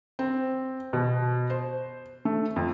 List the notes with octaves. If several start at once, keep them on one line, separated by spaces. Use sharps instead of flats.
C4
B2
C5
A3
F2